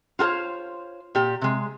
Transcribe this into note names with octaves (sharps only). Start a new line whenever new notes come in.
F4 F#4 A4 C5 C#5
A#2 G4
C3 G#3